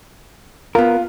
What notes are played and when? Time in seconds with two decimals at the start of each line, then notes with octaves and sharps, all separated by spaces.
0.75 B3 F4 A#4